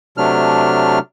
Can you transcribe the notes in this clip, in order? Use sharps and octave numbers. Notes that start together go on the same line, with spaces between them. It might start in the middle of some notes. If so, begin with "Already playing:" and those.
C3 F#3 A3 D4 F6